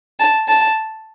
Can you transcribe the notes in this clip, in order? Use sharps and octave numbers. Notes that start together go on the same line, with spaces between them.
A5
A5